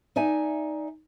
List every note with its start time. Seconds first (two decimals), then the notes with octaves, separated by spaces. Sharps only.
0.16 D#4 D5 E5 G#5